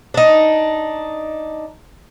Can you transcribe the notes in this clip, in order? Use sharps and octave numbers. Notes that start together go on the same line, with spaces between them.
D4 D#4